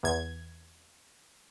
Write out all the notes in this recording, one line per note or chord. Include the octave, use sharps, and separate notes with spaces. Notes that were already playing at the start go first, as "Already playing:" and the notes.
E2 G#6